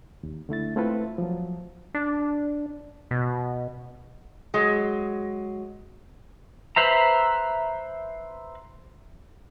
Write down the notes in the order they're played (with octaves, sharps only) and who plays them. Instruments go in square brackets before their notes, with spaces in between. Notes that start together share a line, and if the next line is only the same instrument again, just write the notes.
[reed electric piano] D#2
D3 A3 E4 A6
A3 C4 E4 F4 A4 B4
F3 F#3
[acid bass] D4
B2
[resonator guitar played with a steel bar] F#3 G#3
[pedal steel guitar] B4 C5 E5 A#5